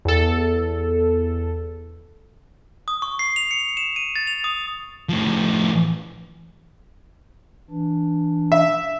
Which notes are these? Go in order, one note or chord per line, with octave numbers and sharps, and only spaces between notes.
E2 A4
D#6
C#6
C7
F7
C#7
E7
D#7
A6
F7
D#6
A2 F3
E3 D4
E5